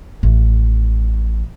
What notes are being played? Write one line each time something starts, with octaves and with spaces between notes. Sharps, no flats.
A1